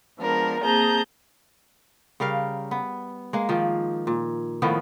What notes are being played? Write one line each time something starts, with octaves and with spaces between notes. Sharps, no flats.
F3 G#3 B3 D4 A#4
A#3 C4 G#4 A5 A#5 G6
C#3 G3 A#4 F5
B3
G#3 A#3
D#3 F3
A#2
A2 D#3 F3 B3